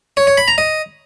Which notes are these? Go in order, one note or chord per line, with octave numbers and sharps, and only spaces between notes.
C#5
C#5
B5
A#5
D#5